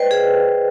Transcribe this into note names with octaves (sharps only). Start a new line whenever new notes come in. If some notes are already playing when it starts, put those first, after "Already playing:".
Already playing: B4 C5 D5 D#5 G5
G#4